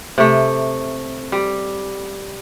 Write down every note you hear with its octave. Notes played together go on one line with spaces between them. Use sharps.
C3 A3
G3